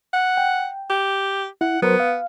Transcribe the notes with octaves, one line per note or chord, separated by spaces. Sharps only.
F#5
G5
G4
E4 F#5
F#3 B3 A#4 C5
F5